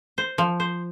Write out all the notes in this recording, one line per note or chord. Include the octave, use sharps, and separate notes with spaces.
C5
F3
C5